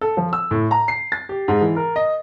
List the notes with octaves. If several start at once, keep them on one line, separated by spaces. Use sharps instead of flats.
A4
F3
E6
A2
A#5
C7
A6
G4
G#2
E3
A#4
D#5